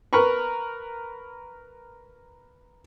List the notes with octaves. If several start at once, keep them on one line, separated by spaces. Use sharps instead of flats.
A#4 B4 B5 C#6